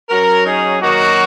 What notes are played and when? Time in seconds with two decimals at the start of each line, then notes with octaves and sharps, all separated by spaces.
0.09 F#3 C#4 F#4 A#4
0.46 D#4 G#4
0.82 D#3 F#3 A#3 D#4 F#4